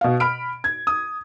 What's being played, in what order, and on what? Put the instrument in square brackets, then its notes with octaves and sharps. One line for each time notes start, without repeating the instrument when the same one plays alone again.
[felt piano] B2 F5
B5 F6 D7
G#6
D#6